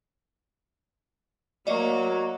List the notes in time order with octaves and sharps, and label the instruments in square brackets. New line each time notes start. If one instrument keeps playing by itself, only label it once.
[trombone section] F#3 [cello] A#3 [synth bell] D5 D#5